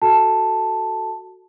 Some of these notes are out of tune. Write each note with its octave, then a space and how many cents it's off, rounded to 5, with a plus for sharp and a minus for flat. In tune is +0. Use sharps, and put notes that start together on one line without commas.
F#4 +0 A4 +0 A5 +0